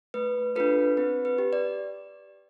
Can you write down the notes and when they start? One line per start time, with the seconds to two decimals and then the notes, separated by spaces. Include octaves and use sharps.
0.14 A3 B4
0.56 D4 F4 A4 B4
0.97 C4 B4
1.25 B4
1.38 G4
1.53 D5